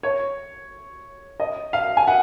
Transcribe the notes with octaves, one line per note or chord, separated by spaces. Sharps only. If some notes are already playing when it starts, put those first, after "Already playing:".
C#5
D#5
F5
G#5
F#5